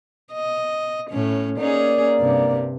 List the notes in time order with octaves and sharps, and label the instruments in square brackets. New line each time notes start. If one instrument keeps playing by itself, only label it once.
[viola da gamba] D#5
A2 C#4
[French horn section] A#3 D5 [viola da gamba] C#4 D#4 G#4
[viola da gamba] G2 C3